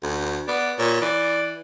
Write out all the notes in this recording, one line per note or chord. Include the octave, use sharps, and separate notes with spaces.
D2
B3 D5
A#2 C#5
E3 D5